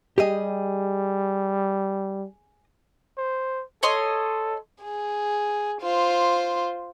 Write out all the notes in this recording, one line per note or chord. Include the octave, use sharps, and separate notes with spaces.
G3 G4 G#4 D#5
C5
A4 C#5 D#5 C6
G#4
F4 C5